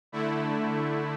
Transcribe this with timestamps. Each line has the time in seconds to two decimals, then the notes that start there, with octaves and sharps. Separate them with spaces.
0.12 D3 A3 E4